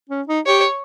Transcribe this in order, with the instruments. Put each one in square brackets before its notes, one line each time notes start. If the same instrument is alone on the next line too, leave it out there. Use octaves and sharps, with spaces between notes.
[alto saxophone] C#4
D#4
[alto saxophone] G4 [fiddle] C#5